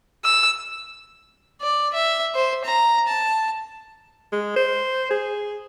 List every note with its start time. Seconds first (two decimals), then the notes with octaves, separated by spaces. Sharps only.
0.24 E6
1.61 D5
1.94 E5
2.35 C5
2.65 A#5
3.07 A5
4.32 G#3
4.56 C5
5.10 G#4